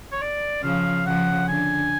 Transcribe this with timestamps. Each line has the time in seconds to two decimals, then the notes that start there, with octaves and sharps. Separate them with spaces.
0.12 C#5
0.21 D5
0.63 C#3 F3 F5
1.05 C#3 F3 F#5
1.48 D3 G#5